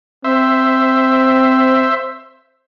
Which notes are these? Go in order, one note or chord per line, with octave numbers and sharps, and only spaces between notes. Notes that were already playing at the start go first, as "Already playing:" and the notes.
C4 C5 E5